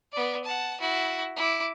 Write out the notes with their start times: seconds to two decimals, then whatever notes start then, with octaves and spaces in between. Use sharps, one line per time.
0.12 B3 D5
0.44 F#5 A5
0.81 E4 F#4
1.37 E4 D6